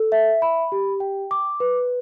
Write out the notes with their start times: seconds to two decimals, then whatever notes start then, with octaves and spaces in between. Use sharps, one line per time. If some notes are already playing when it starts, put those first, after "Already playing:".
Already playing: A4
0.12 E5
0.42 B5
0.72 G4
1.00 G5
1.31 D6
1.60 B4